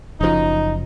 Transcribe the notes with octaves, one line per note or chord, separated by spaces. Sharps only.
F#1 F#2 F3 D#4